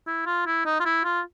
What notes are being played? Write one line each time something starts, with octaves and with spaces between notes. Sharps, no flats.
E4
F4
E4
D#4
F4
E4
F4